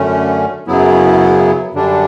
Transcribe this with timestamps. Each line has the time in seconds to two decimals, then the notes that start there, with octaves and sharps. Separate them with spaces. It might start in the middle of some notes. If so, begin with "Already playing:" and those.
Already playing: F#2 D3 A3 C#4
0.67 F#2 C#3 F#3 B3 E4
1.74 F#2 D3 G3 D4